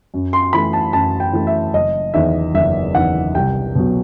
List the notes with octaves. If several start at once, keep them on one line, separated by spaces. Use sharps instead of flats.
F#2
C6
E3 A3 B5
A5
F#2 A5
G5
E3 A3
E5
F#1 D#5
E2 D#3 E5
F#1 E5
E2 D#3 F#5
C2 G5
B2 F#3